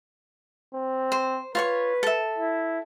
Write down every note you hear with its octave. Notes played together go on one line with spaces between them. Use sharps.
C4
C5
F4 B4 C#5 C#6
A4 E5
E4